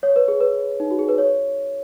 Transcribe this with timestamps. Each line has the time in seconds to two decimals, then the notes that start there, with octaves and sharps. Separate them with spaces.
0.03 C#5
0.16 B4
0.28 G#4
0.40 B4
0.80 D#4
0.91 F#4
0.99 G#4
1.08 B4
1.18 C#5